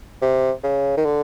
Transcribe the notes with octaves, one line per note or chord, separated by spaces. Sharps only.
C3
C#3
D#3
D3